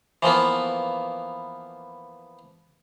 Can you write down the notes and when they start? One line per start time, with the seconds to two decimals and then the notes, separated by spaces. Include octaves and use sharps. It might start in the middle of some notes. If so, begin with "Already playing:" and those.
0.23 E3 F3 A#3 B3